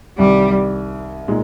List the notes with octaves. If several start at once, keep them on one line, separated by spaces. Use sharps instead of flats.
C2 C3 D#3 G3
A#2 G#3 D#4